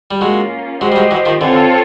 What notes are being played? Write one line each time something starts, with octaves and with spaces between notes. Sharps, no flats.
G3
F#3 G#3 A#3 C#4 F4
F#3 G#3 G4 C5 D#5
G3
F#3 G#3
E3 F#3
D#3 F3
D3 E3 C4 F4 A4 C#5